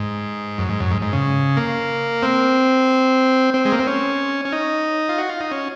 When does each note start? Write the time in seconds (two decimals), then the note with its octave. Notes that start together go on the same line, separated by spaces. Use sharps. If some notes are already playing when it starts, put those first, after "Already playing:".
Already playing: G#2
0.58 F#2
0.69 G#2
0.80 F#2
0.91 G#2
1.02 G#2
1.13 C#3
1.57 A#3
2.23 C4
3.54 C4
3.65 G#3
3.72 A#3
3.79 C4
3.87 C#4
4.45 C#4
4.52 D#4
5.09 F4
5.18 F#4
5.29 F4
5.40 D#4
5.51 C#4